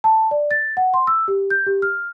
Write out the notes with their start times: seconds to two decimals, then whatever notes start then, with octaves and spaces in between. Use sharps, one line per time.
0.04 A5
0.31 D5
0.51 A6
0.77 F#5
0.94 C6
1.07 E6
1.28 G4
1.50 G6
1.66 G4
1.82 F6